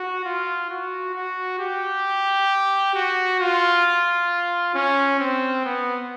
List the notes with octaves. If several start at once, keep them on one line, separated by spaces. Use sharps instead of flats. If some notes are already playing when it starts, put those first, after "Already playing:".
Already playing: F#4
F4
F#4
F#4
G4
F#4
F4
C#4
C4
B3